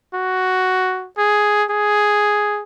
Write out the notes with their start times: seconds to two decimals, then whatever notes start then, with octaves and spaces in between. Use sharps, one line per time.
0.14 F#4
1.18 G#4
1.70 G#4